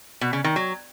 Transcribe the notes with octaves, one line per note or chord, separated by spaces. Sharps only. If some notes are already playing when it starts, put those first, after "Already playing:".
B2
C#3
D#3
F#3